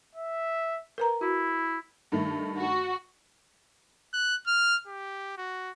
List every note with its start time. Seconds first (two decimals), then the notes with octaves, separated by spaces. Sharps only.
0.15 E5
0.98 A#4 B4 A#5
1.21 E4 F#4
2.12 G2 D#3 A3
2.58 F#4
4.13 F#6
4.47 F6
4.87 G4
5.37 F#4